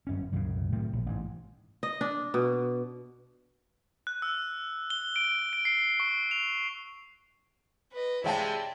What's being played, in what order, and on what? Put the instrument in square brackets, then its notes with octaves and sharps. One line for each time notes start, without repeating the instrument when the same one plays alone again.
[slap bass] G1 F#2 C#4
C2 F#2 A#2 C#3
A2 C3 D#3
A#1
A1 G#2
[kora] D#5
D4
B2
[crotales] F#6
E6
G7
D7
D7
C7
C#6
F7
[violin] B4 D#5
[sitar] C3 G#3 C4 [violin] E4 D5 [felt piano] C#5 G5 A5